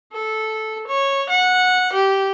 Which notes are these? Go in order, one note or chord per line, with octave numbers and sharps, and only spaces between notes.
A4
C#5
F#5
G4